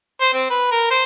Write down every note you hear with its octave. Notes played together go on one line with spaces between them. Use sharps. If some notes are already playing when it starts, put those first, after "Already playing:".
C5
C4
B4
A#4
C5